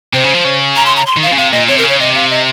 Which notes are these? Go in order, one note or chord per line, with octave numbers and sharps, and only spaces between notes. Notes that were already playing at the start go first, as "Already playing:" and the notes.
C3 C5
C#3
F3
C#3
A#5
C6
A#5
C6
D#3
F3 F5
C#3
C3 F5
A#2 D#5
C3 C#5
A#4
C#3
C#5
C3 D#5
F5
D#5